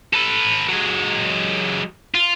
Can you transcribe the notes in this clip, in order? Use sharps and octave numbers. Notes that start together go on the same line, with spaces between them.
A4 B4
F#3 G#3
F4